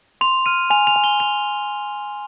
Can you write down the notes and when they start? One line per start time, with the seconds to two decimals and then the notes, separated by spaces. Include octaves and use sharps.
0.21 C6 F7
0.46 F6 D#7
0.70 G#5 F7
0.87 F7
0.96 G#5
1.04 G7
1.20 G#5 F7